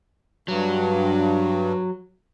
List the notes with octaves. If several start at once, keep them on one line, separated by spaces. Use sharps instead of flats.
G2 F#3